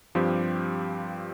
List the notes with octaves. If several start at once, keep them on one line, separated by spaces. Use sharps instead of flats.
G2 F3 C4 G4